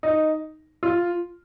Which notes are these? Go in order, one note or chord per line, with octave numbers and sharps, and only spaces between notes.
D#4
F4